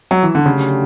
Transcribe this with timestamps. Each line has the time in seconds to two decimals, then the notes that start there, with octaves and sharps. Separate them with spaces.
0.11 F#3
0.23 E3
0.35 D3
0.46 C#3 F#3 A3 D4 G4